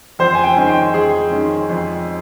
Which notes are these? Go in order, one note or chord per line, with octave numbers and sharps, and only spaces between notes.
F2 C5
G#5
G5
D#3 G#3 C#4
G5
F2 G#4
D#3 G#3 C#4
F2